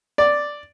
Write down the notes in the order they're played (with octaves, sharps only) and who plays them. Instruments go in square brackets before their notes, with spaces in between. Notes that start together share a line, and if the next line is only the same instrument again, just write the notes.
[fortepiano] D5